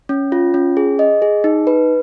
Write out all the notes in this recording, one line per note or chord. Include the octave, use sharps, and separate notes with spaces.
C#4
F4
C#4
G#4
D#5
G#4
D#4
B4